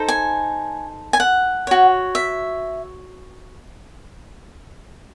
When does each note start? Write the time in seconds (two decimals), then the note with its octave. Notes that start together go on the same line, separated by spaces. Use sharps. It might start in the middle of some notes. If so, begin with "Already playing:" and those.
Already playing: D#4 A4 C5
0.08 G#5
1.13 G#5
1.20 F#5
1.67 F#4 C#5
2.15 E5